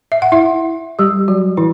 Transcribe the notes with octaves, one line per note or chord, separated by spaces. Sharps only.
E5
F#5
E4 E5
G3 G4
F#3 F#4
E3 E4